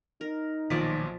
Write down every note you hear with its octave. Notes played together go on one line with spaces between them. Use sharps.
D#4 A#4
B1 A#2 D#3 F3 D5 D#5 B6